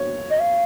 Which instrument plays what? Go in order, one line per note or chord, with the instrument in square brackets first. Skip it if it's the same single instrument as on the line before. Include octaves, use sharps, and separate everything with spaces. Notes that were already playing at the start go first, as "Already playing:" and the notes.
Already playing: [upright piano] C#5
[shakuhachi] D#5
F5